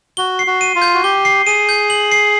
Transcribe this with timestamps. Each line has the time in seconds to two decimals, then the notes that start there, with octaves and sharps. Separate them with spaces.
0.17 F#4 G7
0.39 C7
0.47 F#4
0.61 D#7
0.75 F4
0.82 G6
0.94 F#4
1.03 G4 G7
1.25 C7
1.46 G#4 D#7
1.69 G6
1.90 F#7
2.12 C7